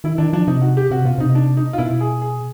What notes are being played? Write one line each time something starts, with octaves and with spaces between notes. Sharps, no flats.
D#3 E4
D#3 D4
F3 D4
C3 D#4
F#4
G4
C3 F#4
B2 F4
C3 D#4
D4
D#4
F4
B2 E4
G#4
G#4